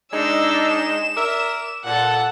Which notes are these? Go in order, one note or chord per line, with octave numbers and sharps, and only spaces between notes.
G#3 D4 D#4 E6
E7
A#4 D5 E5
A#2 A4 F#5